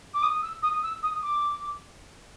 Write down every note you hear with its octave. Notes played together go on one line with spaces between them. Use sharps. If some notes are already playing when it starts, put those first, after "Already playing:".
D6
D#6
E6
D#6
E6
D#6
D6